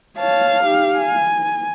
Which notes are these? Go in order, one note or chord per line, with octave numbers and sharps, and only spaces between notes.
C#5 F5 A5
D#4 G4
G#5